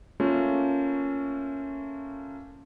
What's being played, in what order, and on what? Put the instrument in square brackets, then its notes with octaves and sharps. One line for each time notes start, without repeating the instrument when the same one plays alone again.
[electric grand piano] A3 A#3 C#4 F4